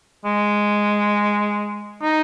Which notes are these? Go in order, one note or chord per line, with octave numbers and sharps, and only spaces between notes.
G#3
D#4